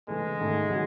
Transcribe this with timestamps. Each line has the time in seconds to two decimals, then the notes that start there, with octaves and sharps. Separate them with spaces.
0.08 C#3 E3 G#3 A3
0.39 G#2 D#3 A3
0.70 C#3 F#3